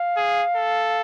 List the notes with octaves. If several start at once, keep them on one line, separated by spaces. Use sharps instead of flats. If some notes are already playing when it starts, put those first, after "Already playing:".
Already playing: F5
G#4
A4